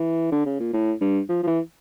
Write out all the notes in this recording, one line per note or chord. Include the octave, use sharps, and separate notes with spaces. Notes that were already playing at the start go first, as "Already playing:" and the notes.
Already playing: E3
D3
C#3
A#2
A2
G2
F3
F3
E3